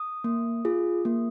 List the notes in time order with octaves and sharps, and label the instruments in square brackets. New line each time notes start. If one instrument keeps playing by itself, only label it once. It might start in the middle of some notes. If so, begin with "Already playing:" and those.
Already playing: [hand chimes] D#6
A#3
F4 G#4
A#3